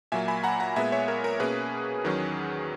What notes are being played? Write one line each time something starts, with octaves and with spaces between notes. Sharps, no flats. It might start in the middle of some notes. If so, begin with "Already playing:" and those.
A#2 F#3 A#3 E5 G#5
G#5 B5
F#5 A#5
F#5 A#5
A#2 G#3 B3 E5 G#5
C#5 E5
A#4
A#4
B2 A#3 C#4 G#4 B4
E2 D#3 F#3 C#4